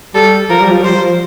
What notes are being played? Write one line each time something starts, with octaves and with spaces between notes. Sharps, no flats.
G3 A4
F3 A#4
G3
F3
G3 C5
F3